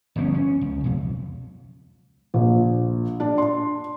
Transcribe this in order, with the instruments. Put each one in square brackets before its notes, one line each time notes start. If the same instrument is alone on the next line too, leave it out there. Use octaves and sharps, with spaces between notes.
[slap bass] G1 F3 B3 C#4
C#4
C#2
B1 F2
[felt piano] A#1
D4
C6